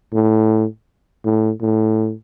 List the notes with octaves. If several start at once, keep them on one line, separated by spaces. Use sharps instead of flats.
A2
A2
A2